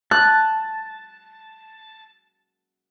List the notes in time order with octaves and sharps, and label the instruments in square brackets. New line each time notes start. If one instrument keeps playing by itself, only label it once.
[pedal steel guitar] A5 [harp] F#6